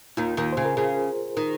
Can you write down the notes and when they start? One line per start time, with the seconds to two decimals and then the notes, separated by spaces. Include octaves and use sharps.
0.17 D#2 D#3 F4
0.37 D#2 D#3
0.53 C#3 C5
0.65 A#4
0.77 C#3 G#4
1.37 D#3